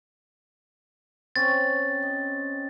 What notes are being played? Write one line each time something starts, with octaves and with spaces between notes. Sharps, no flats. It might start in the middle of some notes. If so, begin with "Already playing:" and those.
C4 C#4 A6
D#5